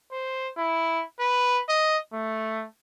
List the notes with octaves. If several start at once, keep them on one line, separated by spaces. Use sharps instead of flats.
C5
E4
B4
D#5
A3